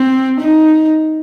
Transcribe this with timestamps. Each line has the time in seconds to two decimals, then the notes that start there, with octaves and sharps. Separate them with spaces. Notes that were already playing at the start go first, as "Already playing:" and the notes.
Already playing: C4
0.40 D#4